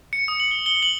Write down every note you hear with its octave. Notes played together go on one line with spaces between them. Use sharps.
C#7
D#6
F#7
G7
G7
F#7